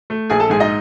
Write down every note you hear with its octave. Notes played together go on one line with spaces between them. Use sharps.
A3
A#1 G#4 G#5
A4 A5
G#2 G#4 G#5
D#4 D#5